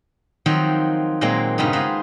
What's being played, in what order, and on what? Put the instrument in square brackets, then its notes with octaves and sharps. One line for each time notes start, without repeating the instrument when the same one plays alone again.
[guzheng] D#3 F3 F#3 C4 F4 C5
A#2 F#3 G#3 A#3 C4
G2 C#3 B3 C4 D#4
G#3 F4 B4 C5